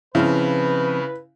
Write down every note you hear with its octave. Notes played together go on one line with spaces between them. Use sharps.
C#3 F3 C4 E4 B4 F5